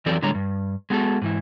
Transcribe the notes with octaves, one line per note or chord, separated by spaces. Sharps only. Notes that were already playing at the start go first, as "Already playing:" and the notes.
F2 E3 F#3 C4 A4 D5
A2 D3 G3 G#3 C#5 A#5
G2
G#3 B3 F#4 A4
G#2 E3 E4